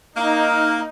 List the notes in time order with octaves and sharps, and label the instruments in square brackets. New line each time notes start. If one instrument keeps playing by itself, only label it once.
[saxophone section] A#3 [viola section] D#4